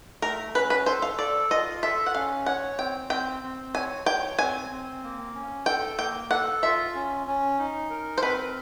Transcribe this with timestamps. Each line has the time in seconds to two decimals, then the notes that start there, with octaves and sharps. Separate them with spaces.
0.22 A3 A#4
0.55 C#4 B4
0.70 B4
0.86 A4 C5
1.02 F5
1.19 A4 D5
1.51 F4 D#5
1.82 A4 E5
2.06 F#5
2.15 C#4 F5
2.46 C#5 F#5
2.79 C4 G5
3.10 C4 G5
3.43 C4
3.75 C#5 G#5
4.06 C#5 G5
4.39 C4 G#5
4.70 C4
5.03 A#3
5.35 C#4
5.66 A4 G5
5.99 A#3 G5
6.31 A4 F#5
6.63 F4 E5
6.95 C#4
7.27 C#4
7.59 D#4
7.90 A#4
8.18 C5
8.23 C4 B4